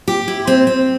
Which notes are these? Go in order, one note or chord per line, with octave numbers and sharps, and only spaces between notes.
G4
E4
C4
C4